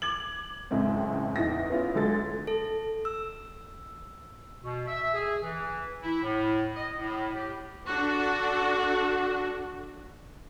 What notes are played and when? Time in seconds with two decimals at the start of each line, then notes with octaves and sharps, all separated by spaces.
0.02 D6 G#6 F#7
0.71 C#2 F#2 A2 G#3 C4
1.36 E2 E3 D#4 A#6
1.70 B3 C#4 E4 F4
1.95 D2 F#3 G#3 A4 A6
2.47 A4
3.05 E6
4.62 B2
4.87 E5
5.14 G#4
5.43 E3
6.03 E4
6.23 A2
6.76 D#5
6.97 A2
7.35 G4
7.85 D4 F#4 A4